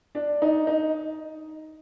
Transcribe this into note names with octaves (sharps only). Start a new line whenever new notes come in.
D4
D#4
D#4